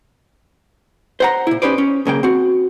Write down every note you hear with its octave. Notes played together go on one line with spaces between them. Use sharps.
C5 F#5 A#5
A#2 E4
C#4 D#4 G4 B4 C5 D5
C#4
B1 C#3 A#3 G5
C4 F#4